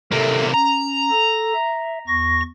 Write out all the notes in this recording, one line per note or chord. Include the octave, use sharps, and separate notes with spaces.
C3 A#3 A4 E5
C#4 A#5
A4
E5
E2 C#6 A#6